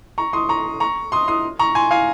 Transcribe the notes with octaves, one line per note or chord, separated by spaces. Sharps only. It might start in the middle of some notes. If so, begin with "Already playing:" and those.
A#5 C#6
C6 D#6
A#5 C#6
A#5 C#6
C6 D#6
C6 D#6
A#5 C#6
G#5 C6
F5 G#5